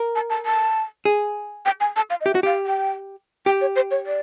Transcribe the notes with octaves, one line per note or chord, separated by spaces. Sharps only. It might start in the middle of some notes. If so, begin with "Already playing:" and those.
Already playing: A#4
A5
A5
A5
G#4
G5
G#5
A5
F5
D#5
G4 E5
F#4
G4 F5
G5
G4 G5
C#5
C5
C#5
D5